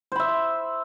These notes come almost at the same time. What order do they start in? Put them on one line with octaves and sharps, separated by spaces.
C5 B5 E5